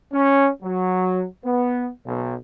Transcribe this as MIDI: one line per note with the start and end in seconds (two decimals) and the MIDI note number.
0.13 0.49 61
0.63 1.25 54
1.45 1.90 59
2.06 2.36 35